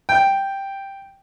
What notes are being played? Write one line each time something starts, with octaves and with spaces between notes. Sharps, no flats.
G5